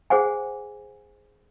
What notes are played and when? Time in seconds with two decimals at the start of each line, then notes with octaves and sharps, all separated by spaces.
0.10 G#4 C5 F#5 G#5